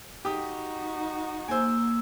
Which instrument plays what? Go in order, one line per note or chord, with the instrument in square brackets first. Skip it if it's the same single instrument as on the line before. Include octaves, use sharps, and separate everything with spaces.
[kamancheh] D#4 F#4 [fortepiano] G4 D#6
[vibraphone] A#3 E6 [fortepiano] C5 G#5